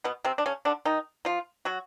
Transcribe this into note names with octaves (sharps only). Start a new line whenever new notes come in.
B2 B3
C3 C4
D4
C#3 C#4
D3 D4
D#3 D#4
F3 F4
F#3 F#4